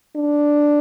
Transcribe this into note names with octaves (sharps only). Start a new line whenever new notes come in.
D4